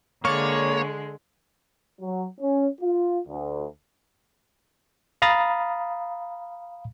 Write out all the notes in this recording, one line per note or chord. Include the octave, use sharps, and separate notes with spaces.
D3 G#3 A#3 C#5 D5 C#6
F#3
C#4
F4
D2
F5 A#5 B5 D#6 A6